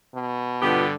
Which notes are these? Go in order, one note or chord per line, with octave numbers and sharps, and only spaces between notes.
B2
G2 D3 B3 F4 G4 B4